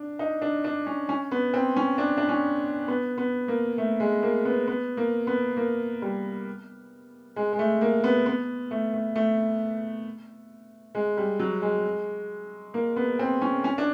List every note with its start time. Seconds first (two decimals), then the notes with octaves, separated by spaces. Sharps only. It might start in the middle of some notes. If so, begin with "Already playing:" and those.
Already playing: D4
0.19 D#4
0.42 D4
0.64 D4
0.86 C#4
1.09 C#4
1.31 B3
1.54 C4
1.76 C#4
1.98 D4
2.17 D4
2.29 C#4
2.88 B3
3.18 B3
3.48 A#3
3.78 A3
4.00 G#3
4.23 A#3
4.45 B3
4.67 B3
4.97 A#3
5.27 B3
5.57 A#3
6.02 G3
7.36 G#3
7.53 G#3
7.59 A3
7.81 A#3
8.04 B3
8.26 B3
8.71 A3
8.93 A3
9.16 A3
10.95 G#3
11.17 G3
11.39 F#3
11.62 G#3
12.74 A#3
12.96 B3
13.19 C4
13.41 C#4
13.64 C#4
13.78 D4